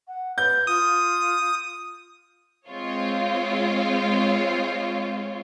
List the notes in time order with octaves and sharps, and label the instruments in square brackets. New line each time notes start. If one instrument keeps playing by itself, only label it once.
[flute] F#5
[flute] B4 [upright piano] G6
[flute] F4 [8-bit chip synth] D#6
[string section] G#3 C4 F4 C#5